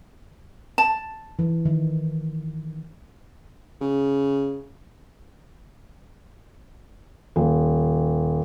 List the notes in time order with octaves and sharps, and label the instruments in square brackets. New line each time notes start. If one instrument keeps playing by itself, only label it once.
[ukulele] A5
[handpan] E3
D#3
[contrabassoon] C#3
[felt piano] D#1